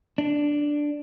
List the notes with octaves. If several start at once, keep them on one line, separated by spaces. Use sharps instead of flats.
D4